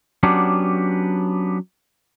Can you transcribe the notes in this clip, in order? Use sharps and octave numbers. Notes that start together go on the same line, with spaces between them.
F#3 B3 C#4 D4 G4